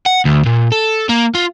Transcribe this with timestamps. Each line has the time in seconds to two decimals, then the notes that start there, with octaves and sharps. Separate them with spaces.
0.06 F#5
0.25 D2
0.46 A#2
0.72 A4
1.09 A#3
1.35 F4